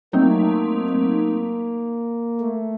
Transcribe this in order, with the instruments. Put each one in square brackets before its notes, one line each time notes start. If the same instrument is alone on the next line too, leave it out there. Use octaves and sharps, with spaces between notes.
[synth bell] F#3 A3 C4 D#4 [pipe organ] A#3
[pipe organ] A#3
A3